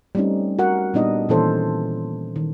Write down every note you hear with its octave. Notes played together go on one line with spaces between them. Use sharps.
G3 A3 C4 C#4 D#4
F#4 A#4 F#5
A#2 G3 B3 D4 D#4 D#5
A#2 D#3 E3 C#4 A4 C5
D#3